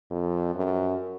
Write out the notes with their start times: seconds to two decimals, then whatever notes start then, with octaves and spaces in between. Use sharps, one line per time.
0.11 F2
0.55 F#2